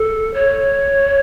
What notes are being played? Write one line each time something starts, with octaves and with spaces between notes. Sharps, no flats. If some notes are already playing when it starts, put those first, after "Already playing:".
Already playing: A4
C#5